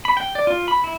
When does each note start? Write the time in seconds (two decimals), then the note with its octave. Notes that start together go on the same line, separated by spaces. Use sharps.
0.05 B5
0.17 G5
0.35 D5
0.47 F4
0.68 B5
0.84 E4